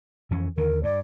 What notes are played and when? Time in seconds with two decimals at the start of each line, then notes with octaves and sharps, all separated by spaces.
0.31 F2 E3 C#4
0.57 D#2 D3 D#3 A#4
0.83 G2 D5